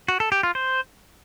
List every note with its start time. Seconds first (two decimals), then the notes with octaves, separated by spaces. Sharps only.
0.08 F#4
0.20 A4
0.32 G4
0.43 F4
0.55 C5